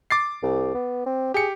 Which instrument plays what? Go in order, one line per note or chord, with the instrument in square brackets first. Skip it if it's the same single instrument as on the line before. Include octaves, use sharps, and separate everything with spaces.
[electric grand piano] D6 A6 C7
[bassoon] C2
B3
C4
[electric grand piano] G4 C#7 [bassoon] G#4